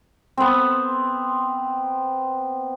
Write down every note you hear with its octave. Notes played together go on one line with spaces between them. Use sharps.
B3 C4